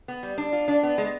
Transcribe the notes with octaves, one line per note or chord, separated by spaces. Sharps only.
B3
G3
D4
F4
D4
B3
G#3